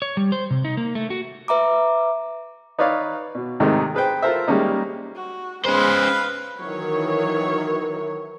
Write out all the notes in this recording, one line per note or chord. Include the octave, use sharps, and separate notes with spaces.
C#5
G3
C5
C3
D#4
A#3
A3
F#4
B4 E5 A#5 D6
D#4 B4 C#5 D5 F5
B2
G#2 C3 D#3 G#3 A3 D#4
G#4 B4 C5 G5
F4 A4 A#4 C5 E5
G3 G#3 A#3 C#4 D#4
F#4
G#3 C#4 B4 C5 F5
D#3 E3 F#3 C#5